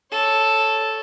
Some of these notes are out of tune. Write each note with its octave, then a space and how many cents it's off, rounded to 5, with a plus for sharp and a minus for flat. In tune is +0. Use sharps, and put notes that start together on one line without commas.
A4 -5 C#5 +0